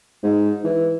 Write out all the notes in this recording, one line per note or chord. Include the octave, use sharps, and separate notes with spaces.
G#2
E3